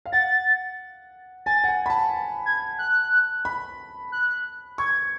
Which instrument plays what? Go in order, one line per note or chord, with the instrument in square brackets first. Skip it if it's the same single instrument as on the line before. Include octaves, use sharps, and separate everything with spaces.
[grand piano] F5
[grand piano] F#5 [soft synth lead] A6
[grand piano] G#5 [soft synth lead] A6
[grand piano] F#5
G#5
B5
A5
[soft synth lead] G#6
F#6
[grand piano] B5
[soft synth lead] F#6
[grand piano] C#6 [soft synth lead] G#6